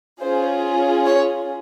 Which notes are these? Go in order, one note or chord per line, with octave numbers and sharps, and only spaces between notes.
C#4 F4 G#4 C5
C#5